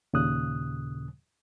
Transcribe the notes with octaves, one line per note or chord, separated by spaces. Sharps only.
D#2 A#2 C#3 D#6 F#6